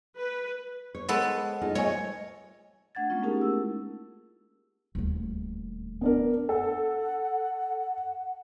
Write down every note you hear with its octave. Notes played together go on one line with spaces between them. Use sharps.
B4
C#5
G#3 B3 A4
D#4 F4 G#4
A3 C#5 D#5 G#5
A3 D4 F#5 G#6 A6
G#3 A#3 B3 C#4 F4
A3 C#4 D#4 G4 G#4 A#4
C4 E4 E6
D#1 D2
B3 D4 A#4
A4 F#5